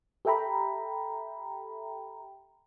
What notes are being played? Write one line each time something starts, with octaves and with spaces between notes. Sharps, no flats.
G4 A4 E5 G5 A#5 B5